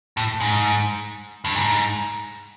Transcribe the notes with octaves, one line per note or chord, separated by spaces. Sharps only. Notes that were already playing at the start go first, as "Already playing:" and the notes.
A2
G#2
G2
G#2